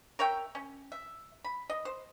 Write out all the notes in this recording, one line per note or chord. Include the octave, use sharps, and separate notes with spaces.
A#4 C#5 E5 G5
C#4
E5
B5
D#5
C5